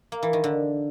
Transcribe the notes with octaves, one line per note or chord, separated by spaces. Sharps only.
A#3
E3
D#3
D3